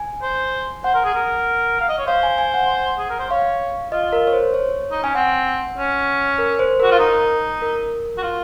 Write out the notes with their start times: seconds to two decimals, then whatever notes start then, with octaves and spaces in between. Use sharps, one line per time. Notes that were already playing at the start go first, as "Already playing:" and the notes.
Already playing: G#5
0.23 C5
0.84 C5 F#5
0.95 A#4
1.05 G#4
1.15 A#4
1.80 F5
1.89 D#5
1.98 C#5
2.07 C5 F5
2.23 G#5
2.38 G#5
2.54 F#5
2.99 G#4
3.10 A#4
3.20 C5
3.30 C#5 F5
3.92 F4 D#5
4.13 A#4
4.27 C#5
4.33 C5
4.54 C#5
4.92 D#4
5.03 C#4 G#5
5.15 C4 F#5
5.77 C#4
6.38 A#4
6.59 C5
6.80 F#4 A#4
6.91 F4
6.99 D#4 A#4
7.62 A#4
8.18 F#4
8.23 F4